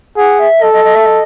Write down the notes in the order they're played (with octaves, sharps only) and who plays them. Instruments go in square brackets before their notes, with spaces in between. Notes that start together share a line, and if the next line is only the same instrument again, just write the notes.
[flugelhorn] G#4 [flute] F#5
[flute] E5
[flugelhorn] A4 [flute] D#5
[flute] D#5
D#5
E5
D#5